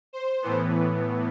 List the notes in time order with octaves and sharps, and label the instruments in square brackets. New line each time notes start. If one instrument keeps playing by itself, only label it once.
[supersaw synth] C5
A2 E3 B3